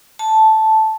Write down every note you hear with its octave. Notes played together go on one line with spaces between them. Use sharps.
A5